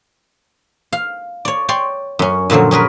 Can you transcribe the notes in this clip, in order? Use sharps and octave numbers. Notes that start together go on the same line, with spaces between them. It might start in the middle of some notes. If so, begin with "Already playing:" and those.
F5
C#5 D5
C#5 D5 G5 C6
F#2 C#4
F#2 A#2 D3 F3 F#3
C#4 G#4 A#4 B4